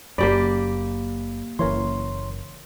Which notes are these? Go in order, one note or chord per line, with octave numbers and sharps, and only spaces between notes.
F#1 F#2 A#3 G4 D5 B5
F#1 E3 A#4 C#5 C6